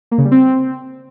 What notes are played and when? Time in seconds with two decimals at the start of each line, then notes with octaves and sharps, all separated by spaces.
0.11 A#3
0.18 C#3
0.25 G3
0.32 C4